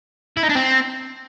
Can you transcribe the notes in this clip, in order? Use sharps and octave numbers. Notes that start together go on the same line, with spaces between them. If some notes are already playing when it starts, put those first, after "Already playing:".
E4
D#4
D4
C4